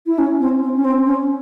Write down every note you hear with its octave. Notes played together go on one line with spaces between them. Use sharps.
E4
C#4
C4
C4
C#4
C4
C#4